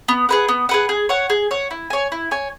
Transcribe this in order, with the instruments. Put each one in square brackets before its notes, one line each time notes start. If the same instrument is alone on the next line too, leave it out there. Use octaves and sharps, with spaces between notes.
[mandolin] B3
G#4 B4 F#5
B3
G#4 B4 F#5
G#4
C#5 F#5
G#4
C#5 F#5
E4
C#5 G#5
E4
C#5 G#5